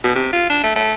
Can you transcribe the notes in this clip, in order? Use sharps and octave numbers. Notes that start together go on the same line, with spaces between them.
B2
C3
F4
D4
A3
A3